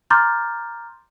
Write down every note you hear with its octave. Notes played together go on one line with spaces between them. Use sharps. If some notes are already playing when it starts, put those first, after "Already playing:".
A#5 C6 D6 F6 G6 A6